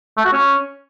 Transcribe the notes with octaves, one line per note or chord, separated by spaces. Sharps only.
A3
F#4
C#4